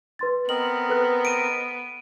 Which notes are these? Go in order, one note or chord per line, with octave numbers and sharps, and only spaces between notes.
B4 C6 A6
B3 C4 A#4 D#5 F#7
A4 B4 F#6
D7 D#7